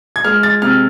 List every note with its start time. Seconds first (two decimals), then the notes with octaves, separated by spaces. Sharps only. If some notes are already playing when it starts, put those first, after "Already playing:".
0.16 G#6
0.24 G#3 F6
0.43 A6
0.62 C3 F6